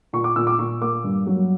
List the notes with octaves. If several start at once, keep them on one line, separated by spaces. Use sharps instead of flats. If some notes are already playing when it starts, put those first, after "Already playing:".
A#2 C#6
D6
A#2 E6
D6
A#2 C#6
A#3 D6
G2
F#3